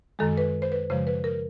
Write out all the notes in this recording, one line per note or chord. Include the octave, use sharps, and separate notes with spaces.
F#2 D#3 G#3 A4
B4
C5
B4
F#2 C#3 F3 G#3 C5
B4
A#4